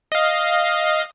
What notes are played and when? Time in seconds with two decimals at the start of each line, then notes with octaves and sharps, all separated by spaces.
0.12 D#5 F5